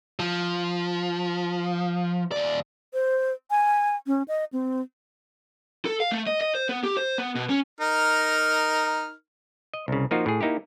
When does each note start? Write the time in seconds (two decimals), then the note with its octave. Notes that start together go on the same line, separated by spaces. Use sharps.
0.19 F3
2.32 D#2 D5
2.94 C5
3.51 G#5
4.07 C#4
4.28 D#5
4.53 C4
5.85 A4
6.00 F5
6.12 A3
6.27 D#5
6.41 D#5
6.55 C5
6.69 B3
6.83 G4
6.97 C5
7.18 B3
7.35 B2
7.49 C#4
7.81 D#4 A#4 F6
9.74 D#5
9.88 C2 C#3
10.11 F3 A#3 D#4 F4 F#4
10.26 A2 G#4
10.41 A#3 D#4 E4 G4